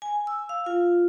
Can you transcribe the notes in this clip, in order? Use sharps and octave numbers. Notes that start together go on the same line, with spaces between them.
G#5
E6
F5
F4